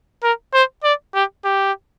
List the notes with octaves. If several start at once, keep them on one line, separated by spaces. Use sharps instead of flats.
A#4
C5
D5
G4
G4